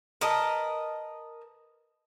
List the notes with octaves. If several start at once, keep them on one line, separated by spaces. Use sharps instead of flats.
A#4 B4 D#5 A5